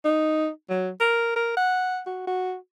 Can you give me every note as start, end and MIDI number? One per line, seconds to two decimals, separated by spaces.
0.05 0.48 63
0.70 0.90 54
1.01 1.32 70
1.36 1.56 70
1.57 2.01 78
2.06 2.24 66
2.27 2.55 66